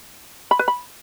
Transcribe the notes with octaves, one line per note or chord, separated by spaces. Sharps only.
B5
B4
B5